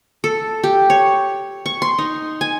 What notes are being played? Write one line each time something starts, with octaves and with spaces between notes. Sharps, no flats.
A4
G4
C#5
C#6
C6
D#4
G#5